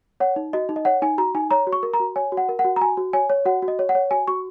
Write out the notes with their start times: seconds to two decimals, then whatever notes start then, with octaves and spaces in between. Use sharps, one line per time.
0.20 C#5 F#5
0.36 D#4
0.53 F#4 D#5
0.69 D#4
0.76 D#5
0.85 C#5 F#5
1.02 D#4 G#5
1.18 F#4 A#5
1.35 D#4 G#5
1.51 C#5 A#5
1.67 F#4
1.72 C#6
1.83 A#4
1.94 A#5
2.00 F#4
2.16 C#5 G#5
2.32 F#4
2.37 F#5
2.49 A#4
2.59 F#5
2.65 F#4
2.76 A#5
2.81 F#4 G#5
2.97 F#4
3.13 C#5 G#5
3.30 C#5
3.45 F#4 F#5
3.62 F#4
3.68 D#5
3.79 C#5
3.89 F#5
3.95 C#5
4.11 F#4 G#5
4.27 F#4 C#6